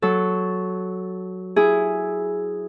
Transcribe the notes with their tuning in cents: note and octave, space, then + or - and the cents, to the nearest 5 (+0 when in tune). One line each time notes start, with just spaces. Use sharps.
F#3 +0 A4 -10
E4 +0 G#4 +0